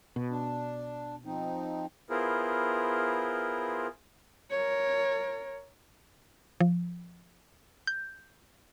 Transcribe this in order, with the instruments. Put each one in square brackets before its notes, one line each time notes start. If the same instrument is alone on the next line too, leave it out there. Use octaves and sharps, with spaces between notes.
[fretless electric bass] B2
[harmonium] D4
F3 C4 D#4
[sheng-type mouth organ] B3 E4 F4 G#4 A#4 C5
[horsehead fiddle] A#4 C#5
[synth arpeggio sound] F3
G6